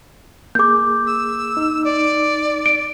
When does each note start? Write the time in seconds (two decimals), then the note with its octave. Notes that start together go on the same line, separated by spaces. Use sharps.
0.55 A#3 G#4 D6 G6
1.07 E6
1.57 D#4
1.85 D5
2.66 D7